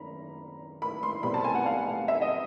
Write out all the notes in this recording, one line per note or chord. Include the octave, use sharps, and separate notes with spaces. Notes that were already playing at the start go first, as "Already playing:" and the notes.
Already playing: G#1 F#2 D#3 A#5 B5
B5
C6
C2 B2 G3 C4 B5
A5
G#5
F#5
F5
F5
E5
D#5